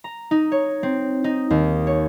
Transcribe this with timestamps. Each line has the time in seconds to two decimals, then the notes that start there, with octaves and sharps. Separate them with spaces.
0.04 A#5
0.31 D#4
0.52 C#5
0.83 C4
1.24 D#4
1.50 D#2
1.87 C#5